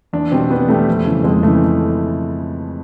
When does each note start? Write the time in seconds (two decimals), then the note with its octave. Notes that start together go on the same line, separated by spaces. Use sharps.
0.13 E2 D4
0.31 B2 G3 C4
0.50 E2 B3
0.69 B2 G3 A3
0.87 F2
1.06 C#3 E3
1.24 F2 G#3
1.43 C#3 E3 A3